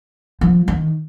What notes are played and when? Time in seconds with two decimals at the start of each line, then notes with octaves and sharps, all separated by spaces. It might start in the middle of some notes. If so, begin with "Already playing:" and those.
0.41 F3
0.68 D#3